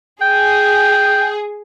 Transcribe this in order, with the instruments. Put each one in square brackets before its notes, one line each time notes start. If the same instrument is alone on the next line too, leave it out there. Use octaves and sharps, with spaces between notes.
[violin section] G#4 [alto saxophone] G5